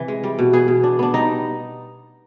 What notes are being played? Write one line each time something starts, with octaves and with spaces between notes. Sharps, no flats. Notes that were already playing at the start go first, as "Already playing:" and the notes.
Already playing: C3 E3
G#3
G3
B2
B3 G#4
B2
D4
B3 D4
G3 D#4